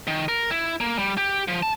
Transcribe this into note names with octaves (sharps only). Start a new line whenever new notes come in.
D#3
A#4
E4
A#3
G3
G4
F3
A5